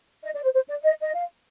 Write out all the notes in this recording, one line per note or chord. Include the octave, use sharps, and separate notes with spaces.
D#5
D5
C5
C5
D5
D#5
D#5
F5